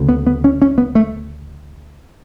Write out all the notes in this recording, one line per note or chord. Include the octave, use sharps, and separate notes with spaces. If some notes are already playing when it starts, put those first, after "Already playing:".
Already playing: D2 C#3
B3
B3
C#4
C#4
B3
A3